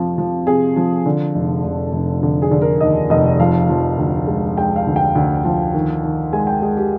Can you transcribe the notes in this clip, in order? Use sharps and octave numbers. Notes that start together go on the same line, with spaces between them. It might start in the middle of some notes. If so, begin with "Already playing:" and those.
Already playing: F2 C3 F3
F3
C3 G#4
F3
D3
F1
F1
F1
D3
G#4
D3
A#4
D#2 D#5
F1 D#5
F3 F5
F3
D2
G#3
G#3 G5
F5
D2
G5
D2
F3
D#3
D#3
G#3 G#5
G5
G#3 G#4
G4